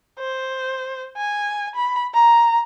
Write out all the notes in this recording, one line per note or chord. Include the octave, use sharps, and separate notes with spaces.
C5
G#5
B5
A#5